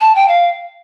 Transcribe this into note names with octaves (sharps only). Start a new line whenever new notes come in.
A5
G5
F5